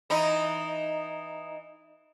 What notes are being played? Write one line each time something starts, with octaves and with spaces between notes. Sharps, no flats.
E3 D#4